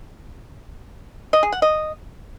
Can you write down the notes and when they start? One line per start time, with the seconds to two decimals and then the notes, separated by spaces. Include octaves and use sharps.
1.33 D#5
1.43 G#4
1.52 F#5
1.62 D#5